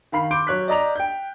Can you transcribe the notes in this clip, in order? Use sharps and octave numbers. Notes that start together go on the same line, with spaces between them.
D#3 F5 B5 C7
C6 D6 G6 D7
F#3 C#5 F#6 B6
D5 D#5 A#5 F7
G5 G6